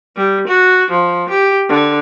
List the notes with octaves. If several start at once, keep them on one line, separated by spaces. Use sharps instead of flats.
G3
F#4
F3
G4
D3